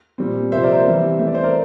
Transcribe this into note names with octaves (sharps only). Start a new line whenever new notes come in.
A#2 G3 C4
C3 F3 A#3 C5 E5
A#4 D5
C5 E5
E3 G3 C4
E3 A3 C4 E5
D5
C5
A#4 D5